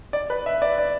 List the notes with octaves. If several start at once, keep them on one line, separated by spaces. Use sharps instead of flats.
D5
B4
E5
D5
D5